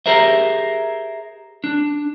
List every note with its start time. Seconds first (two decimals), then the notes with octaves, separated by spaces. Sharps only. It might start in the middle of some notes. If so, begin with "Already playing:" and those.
0.06 G4 G#4 A#4 C5 E5
1.64 D4